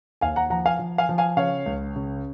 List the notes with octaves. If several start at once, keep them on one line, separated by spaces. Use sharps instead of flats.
D#2 F5 G#5
F#5 A#5
F3 F#5 A#5
F5 G#5
F3
F5 G#5
F3
F5 G#5
C#3 C#5 F5
C#2
C#3